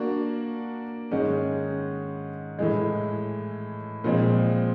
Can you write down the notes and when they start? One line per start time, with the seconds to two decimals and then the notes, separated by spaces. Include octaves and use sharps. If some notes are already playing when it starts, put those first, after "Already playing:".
Already playing: A#3 D4 F#4
1.11 G#2 D#3 G#3 C#4
2.59 A2 E3 G#3
4.04 A#2 F3 G#3 C4